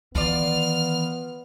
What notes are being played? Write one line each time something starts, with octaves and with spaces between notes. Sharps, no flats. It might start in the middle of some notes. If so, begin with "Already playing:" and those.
D#3 E3 B3 F4 D5 F6